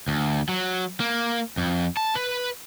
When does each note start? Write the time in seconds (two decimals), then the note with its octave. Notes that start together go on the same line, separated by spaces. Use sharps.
0.08 D2
0.49 F#3
1.00 A#3
1.57 F2
1.97 A5
2.15 B4